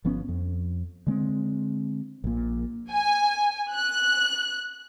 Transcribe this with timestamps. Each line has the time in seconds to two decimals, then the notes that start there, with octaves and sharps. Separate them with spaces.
0.05 G1 F3 B3 C#4
0.28 F2
1.07 D3 G#3 C4
2.24 A#1 A#2
2.91 G#5
3.73 F#6